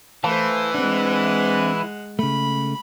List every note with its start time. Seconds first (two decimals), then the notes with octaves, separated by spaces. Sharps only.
0.24 E3 A3 C5 F5 A5
0.74 G#3 C4 D4 F#5
2.19 C#3 A3 B5